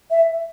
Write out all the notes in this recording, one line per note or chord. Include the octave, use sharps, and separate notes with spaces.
E5